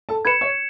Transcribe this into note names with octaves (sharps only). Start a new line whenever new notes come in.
A4 A5
B4 B5 G#6 C#7 E7
C#5 C#6